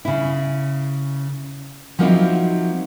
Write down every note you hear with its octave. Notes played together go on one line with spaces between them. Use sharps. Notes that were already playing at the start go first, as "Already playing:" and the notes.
C#3 E4
F3 F#3 A#3 C4 D#4 E4